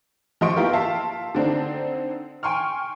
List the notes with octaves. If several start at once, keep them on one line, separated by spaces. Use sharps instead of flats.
F3 G4 D#5 C6 C#6 D7
A#3 B3 E4 F4 G4 A#4
E5 F5 A5 C6
D3 C4 D4 D#4
G5 G#5 C6 C#6 F6